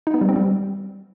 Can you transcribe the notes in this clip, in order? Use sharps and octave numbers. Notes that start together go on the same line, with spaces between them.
D#4
B3
G3
C4
G3